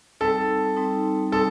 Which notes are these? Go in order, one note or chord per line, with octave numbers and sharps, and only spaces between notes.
G3 C4 D#4 A4
G3 C4 D#4
G3 C4 D#4 A4